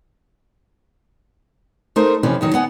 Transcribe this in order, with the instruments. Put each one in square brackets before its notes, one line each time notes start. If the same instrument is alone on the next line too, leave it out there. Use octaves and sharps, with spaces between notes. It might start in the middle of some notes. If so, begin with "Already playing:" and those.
[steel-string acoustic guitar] A3 D#4 A#4 C5
F2 C3 E3 F3 C#4
E2 D#3 F#3
B3 F#5 G#5